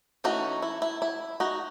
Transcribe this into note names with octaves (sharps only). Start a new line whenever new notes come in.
E3 A3 C#4 D#4 F#4
E4
E4
E4
D#4 F#4